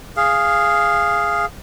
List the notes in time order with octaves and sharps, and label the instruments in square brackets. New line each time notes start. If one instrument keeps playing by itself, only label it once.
[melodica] G#4 F5